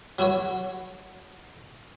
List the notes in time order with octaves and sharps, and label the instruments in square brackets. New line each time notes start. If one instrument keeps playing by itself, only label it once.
[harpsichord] F#3 E4 F#4 C#5